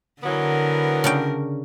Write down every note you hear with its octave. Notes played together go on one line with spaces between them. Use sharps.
D3 E3 F#3 B3 A#4
C#3 D4 G5